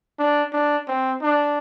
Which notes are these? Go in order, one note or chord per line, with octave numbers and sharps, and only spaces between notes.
D4
D4
C4
D4